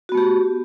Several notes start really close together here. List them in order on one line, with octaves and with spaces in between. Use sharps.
F#4 B3 A3 G4